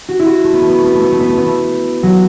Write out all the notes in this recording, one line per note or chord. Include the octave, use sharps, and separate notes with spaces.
F#4
E4
F#4
A3
B3
A3
B3
A3
B3
A3
B3
A3
B3
A3
B3
A3
F#3